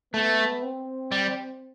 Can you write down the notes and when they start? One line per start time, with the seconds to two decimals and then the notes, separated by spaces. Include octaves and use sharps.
0.14 A3 B3
0.63 C4
1.11 G3